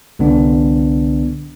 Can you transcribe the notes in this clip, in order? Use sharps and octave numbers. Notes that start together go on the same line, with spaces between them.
C2 D3 B3 D4